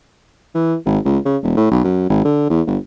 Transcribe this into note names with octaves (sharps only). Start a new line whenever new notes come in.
E3
G#1
C#2
C#3
E1
A2
B1
F#2
G#1
D3
E2
G1